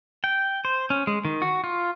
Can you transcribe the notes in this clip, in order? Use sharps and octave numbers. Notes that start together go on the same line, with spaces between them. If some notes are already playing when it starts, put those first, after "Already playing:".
G5
C5
C#4
G#3
D#3
F#4
F4